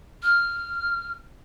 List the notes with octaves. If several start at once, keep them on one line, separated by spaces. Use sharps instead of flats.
F6